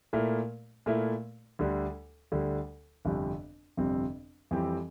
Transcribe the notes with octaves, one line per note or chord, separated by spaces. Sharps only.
A#2 A3 E4 A#4
A#2 A3 E4 A#4
D2 D3 G3
D2 D3 G3
G1 F2 C3 G3 C4
G1 F2 C3 G3 C4
F2 E3 G3 C4 G4